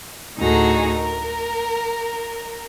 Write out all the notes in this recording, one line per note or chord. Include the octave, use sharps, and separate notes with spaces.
D2 A2 D#4 F#4 G#4 A#5
A#4